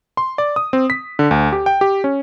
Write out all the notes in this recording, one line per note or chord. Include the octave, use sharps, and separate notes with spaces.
C6
D5
D#6
C4
B6
D3
D2
G4
G5
G4
C#4